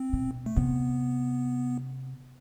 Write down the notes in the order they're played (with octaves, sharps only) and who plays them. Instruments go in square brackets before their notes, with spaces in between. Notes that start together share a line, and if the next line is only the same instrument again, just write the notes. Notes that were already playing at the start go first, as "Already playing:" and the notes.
Already playing: [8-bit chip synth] C4
[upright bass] B2
[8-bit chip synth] A3
[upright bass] C3 [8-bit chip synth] B3